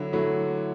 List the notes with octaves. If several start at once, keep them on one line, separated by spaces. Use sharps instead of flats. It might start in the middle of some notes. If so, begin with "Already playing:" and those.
Already playing: D3 F#3 E4
F#3 A3 E4